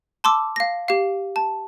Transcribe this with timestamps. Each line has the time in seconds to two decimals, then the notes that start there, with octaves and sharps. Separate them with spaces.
0.24 A5 C6 D6 E6
0.56 F5 A#6
0.88 G4 F5
1.36 A5